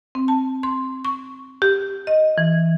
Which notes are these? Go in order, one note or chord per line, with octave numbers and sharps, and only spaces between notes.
C4
A5
C6
C#6
G4
D#5
E3